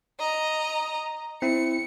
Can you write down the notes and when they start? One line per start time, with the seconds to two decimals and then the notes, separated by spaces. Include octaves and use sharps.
0.19 D#5 A#5
1.42 C4 E4 C#7